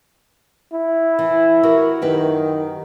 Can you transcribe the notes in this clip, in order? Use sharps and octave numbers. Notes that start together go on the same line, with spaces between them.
E4
E3
F#4 G4 A#4
F#2 D#3 G4 B4